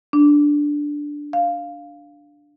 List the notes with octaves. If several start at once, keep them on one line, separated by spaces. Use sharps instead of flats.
D4
F5